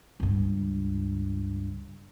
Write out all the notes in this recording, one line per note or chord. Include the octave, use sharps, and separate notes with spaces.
C#2 G2